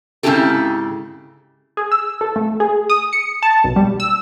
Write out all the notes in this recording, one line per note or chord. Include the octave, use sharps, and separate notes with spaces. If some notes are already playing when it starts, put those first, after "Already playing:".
G#2 C#3 C4 E4 G4 A4
G#4
E6
A4
A3
G#4
D#6
C#7
A5
B1
G3
E6